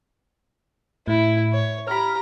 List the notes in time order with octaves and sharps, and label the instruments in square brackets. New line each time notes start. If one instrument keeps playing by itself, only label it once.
[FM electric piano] A2 [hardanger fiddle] E4
[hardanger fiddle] C#5
[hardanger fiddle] G4 A#5 [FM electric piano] B5 F6